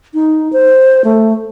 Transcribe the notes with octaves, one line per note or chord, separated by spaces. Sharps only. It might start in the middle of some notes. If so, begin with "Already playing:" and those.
D#4
C5
A3